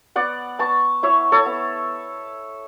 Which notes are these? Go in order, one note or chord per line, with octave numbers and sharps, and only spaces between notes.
B3 D5 F#5
B3 A5 C#6
E4 C#5 E5
A4 C#5
B3